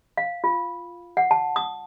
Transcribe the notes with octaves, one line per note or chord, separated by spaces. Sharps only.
F5
F4
F#5
A5
D#6